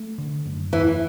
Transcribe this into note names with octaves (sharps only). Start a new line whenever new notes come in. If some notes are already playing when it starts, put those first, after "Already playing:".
Already playing: A3
D3
F#1
E2 E3